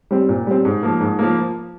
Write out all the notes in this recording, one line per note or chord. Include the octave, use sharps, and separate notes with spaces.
G3 C4
A#2
G3 C4
G#2
F3 A#3
G#2
F3 A#3